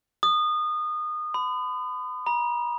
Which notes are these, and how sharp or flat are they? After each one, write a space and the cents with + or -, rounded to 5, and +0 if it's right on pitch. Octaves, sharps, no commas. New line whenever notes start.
D#6 -25
B5 +40
A#5 +45